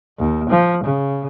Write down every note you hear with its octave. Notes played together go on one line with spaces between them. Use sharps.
D#2
F3
C#3